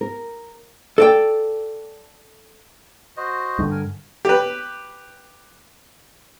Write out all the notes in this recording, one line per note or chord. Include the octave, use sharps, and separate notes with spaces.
A#4
A4 D5 G5
F#4 C5 D#5
G2 D3
A#4 G#5
G4 B4